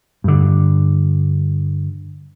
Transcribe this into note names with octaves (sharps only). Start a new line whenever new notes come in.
G2 D3